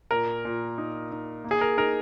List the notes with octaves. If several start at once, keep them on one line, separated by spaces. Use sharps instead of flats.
A#2 A#4
A#2
D#4
D#4
A#3
G#4
A#4
D#4 A#4